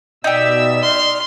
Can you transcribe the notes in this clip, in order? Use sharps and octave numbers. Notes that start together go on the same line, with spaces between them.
B2 D#4 G4 D5 E5 E6
C6 F6